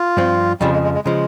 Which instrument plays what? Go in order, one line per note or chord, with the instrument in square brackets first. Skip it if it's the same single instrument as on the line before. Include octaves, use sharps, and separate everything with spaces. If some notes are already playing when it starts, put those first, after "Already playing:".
Already playing: [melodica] F4
[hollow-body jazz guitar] G2 F3 C4
[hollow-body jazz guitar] F2 C#3 F3 [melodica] G3
[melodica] G#3
G#3
G#3
[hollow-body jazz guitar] C#3 F3 [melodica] G#3